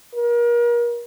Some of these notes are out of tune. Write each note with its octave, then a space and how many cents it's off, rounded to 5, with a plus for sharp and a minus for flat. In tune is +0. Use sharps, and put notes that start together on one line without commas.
A#4 +35